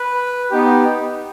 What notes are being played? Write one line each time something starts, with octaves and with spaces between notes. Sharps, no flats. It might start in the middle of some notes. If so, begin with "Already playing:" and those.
Already playing: B4
B3 D#4 G4